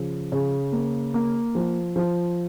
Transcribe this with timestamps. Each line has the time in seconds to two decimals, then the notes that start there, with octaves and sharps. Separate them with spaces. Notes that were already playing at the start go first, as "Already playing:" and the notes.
Already playing: C#3 F3
0.32 C#3
0.72 A#3
1.14 A#3
1.55 F3
1.96 F3